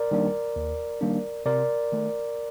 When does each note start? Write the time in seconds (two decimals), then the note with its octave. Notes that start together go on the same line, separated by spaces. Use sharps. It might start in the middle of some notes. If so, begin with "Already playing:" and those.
Already playing: A#4 D5
0.11 D#3 G3 A#3 D4
0.56 D#2
1.01 D#3 G3 A#3 D4
1.46 C3 A#4 D5
1.92 D#3 A3